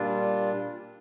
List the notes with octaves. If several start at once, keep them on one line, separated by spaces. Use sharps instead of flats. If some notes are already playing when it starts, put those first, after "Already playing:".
Already playing: A#2 G3 D4 F4